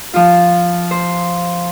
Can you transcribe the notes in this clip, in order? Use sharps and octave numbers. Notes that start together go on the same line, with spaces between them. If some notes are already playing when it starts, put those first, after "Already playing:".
F3 F4
C5